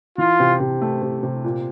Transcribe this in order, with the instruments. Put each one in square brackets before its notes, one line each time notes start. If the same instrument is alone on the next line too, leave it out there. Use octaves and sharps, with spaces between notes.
[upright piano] E3 [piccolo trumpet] F4
[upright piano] C3
C3
A3
C3
C3
A#2